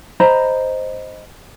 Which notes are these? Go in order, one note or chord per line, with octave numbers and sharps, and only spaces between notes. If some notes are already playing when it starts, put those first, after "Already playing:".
C5 D#5 A#5 B5